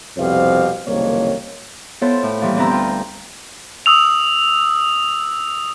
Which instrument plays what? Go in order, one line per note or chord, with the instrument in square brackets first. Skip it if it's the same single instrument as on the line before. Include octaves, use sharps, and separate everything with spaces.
[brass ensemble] C2 F2 B2 G4 C5 F5
F#1 C2 F2 D#3 A#3 C#5
[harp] B3 E4 F4 A4 C5 C#5
A2
A#2 E3 F3 G3
D2 C4 G4 B4 A#5 E6
F4 G5
[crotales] D#6 E6 F7